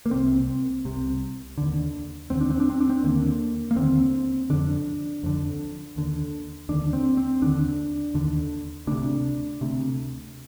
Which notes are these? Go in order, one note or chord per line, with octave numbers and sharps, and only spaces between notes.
A#3
C2 C3 C4
C2 C3
D#2 D3
D#2 D3 C4
D4
C4
D4
C4
D4
C4
D#2 D3 A#3
A#3
D#2 D3 C4
F2 D3 D4
F2 D3
D#2 D3
D#2 D3 D4
C4
C4
D#2 D3 D4
D#2 D3
D2 C3 D4
D2 C3